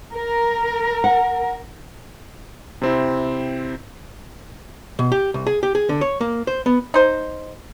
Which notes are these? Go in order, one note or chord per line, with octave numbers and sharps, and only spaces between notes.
A#4
F#5
C3 C4 E4
B2
G4
C2
G#4
G4
G#4
D3
C#5
A#3
C5
B3
D#4 C5